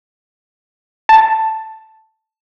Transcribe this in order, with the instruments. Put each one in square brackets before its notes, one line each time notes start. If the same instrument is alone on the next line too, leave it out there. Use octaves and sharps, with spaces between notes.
[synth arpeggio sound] A5